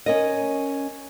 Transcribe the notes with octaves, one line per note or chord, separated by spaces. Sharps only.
C#4 A#4 D#5